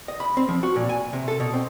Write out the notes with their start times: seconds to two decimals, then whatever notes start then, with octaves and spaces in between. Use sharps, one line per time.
0.08 D#5
0.20 B5
0.37 C4
0.49 F3
0.63 F#4
0.76 A#2
0.89 G#5
1.13 C3
1.28 A4
1.40 B2
1.53 C4